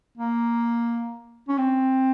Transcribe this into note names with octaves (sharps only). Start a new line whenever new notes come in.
A#3
C#4
C4